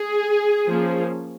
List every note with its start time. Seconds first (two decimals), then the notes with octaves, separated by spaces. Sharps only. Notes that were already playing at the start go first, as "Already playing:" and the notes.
Already playing: G#4
0.66 F3 A#3 C#4